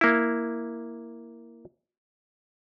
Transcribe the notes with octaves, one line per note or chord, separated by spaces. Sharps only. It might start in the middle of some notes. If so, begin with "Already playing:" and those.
A#3 E4